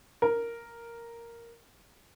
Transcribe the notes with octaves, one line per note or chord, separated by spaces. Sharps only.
A#4